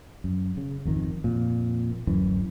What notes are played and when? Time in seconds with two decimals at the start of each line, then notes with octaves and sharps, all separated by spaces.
0.24 F#2
0.57 C#3
0.85 G#1 F2 D#3
1.24 F2 A#2
2.07 D1 F#2 E3